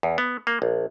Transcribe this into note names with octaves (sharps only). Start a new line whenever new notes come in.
E2
B3
A#3
A#1